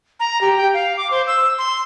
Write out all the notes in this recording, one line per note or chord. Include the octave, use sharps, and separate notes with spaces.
A#5
G4
G5
F5
D6
C5
E6
C6